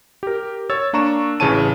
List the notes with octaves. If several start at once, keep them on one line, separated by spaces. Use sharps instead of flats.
G4 A#4
C#5 E6 A6
A#3 D4 A#5 C#6 E7
A1 C#3 E3 C#5 A5 D#7